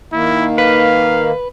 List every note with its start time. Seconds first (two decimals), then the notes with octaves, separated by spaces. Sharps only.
0.13 D#3 A#3 E4
0.58 B4 F5